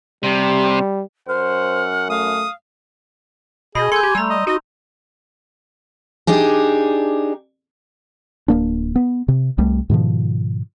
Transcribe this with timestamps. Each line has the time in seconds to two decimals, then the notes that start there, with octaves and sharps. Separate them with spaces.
0.23 C3 G3
1.29 F#2 C5 F#5 F6
2.10 A3 F5 D#6
3.75 B2 G#4 D#5 B5
3.92 A4 G#5 C6 G6
4.03 G4
4.15 G3 A3 A#5 E6
4.30 D#5
4.47 D#4 F#4 D#5
6.27 D4 D#4 G4 G#4
8.48 D1 A#3 D4
8.96 B3
9.28 C3
9.58 C2 G3 A3
9.90 G#2 B2 D#3 F3